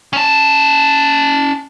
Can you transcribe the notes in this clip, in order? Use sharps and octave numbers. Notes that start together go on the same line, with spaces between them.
C#4 A5